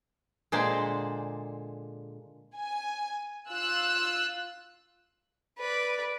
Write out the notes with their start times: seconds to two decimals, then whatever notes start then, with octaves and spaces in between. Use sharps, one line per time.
0.52 A#2 D3 G#3 C5 D5
2.56 G#5
3.49 F4 E6 F#6
5.58 B4 D5